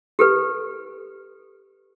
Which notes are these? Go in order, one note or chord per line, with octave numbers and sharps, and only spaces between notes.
G4 A4 B4